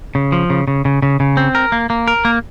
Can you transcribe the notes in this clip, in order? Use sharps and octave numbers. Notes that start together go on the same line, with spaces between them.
C#3
F3
C#3
C#3
C#3
C#3
C#3
C4
A#4
A#3
A#3
A#4
A#3